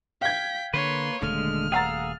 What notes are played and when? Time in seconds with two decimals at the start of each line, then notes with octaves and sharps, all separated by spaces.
0.22 F5 G5 G#6 B6
0.74 D3 A#3 B4 C#5 C6
1.22 D#1 D3 G#3 A3 F6
1.72 G#4 F5 F#5 A#5 E6 A6